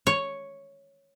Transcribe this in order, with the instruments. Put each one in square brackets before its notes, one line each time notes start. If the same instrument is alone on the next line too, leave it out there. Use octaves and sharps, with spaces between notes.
[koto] C#5